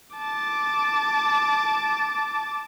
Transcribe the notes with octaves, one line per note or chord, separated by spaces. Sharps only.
A5 D6